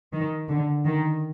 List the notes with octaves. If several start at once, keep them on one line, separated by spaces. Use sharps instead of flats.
D#3
D3
D#3